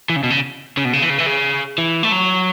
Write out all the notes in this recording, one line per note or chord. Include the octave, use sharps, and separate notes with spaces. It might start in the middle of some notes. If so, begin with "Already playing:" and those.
E3
C#3
B2
C#3
C#3
B2
C#3
E3
C#3
E3
C#3
E3
A3
F#3